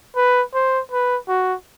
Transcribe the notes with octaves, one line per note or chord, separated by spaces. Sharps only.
B4
C5
B4
F#4